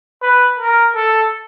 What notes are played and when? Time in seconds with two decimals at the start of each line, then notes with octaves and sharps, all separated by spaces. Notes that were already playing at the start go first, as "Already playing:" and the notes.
0.22 B4
0.59 A#4
0.95 A4